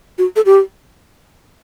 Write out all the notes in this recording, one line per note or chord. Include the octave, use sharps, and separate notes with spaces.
F#4
A4
G4